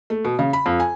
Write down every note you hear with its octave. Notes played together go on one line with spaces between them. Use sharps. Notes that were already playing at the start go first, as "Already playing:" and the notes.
A3
B2
C#3
B5
F2
G#5